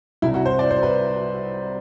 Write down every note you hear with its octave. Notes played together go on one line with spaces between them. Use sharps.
C2 C3 G3 E4
F#4
C5
D5
C5
B4